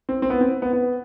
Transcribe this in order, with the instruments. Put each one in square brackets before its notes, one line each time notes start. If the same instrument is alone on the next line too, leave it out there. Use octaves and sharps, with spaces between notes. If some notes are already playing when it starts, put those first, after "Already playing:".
[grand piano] C4
C4
B3
C4
B3
B3